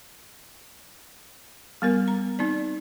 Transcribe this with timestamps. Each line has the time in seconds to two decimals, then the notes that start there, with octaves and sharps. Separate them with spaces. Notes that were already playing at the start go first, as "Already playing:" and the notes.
1.82 G3 B3 A#4
2.08 A#5
2.39 C4 D#4 D5